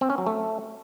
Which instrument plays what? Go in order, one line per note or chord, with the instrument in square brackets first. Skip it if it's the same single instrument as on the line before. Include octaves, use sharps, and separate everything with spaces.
[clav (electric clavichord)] C4
C#4
F#3
A3